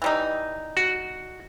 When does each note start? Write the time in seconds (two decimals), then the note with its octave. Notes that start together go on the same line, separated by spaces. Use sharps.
0.02 E3 G3 D#4
0.77 F#4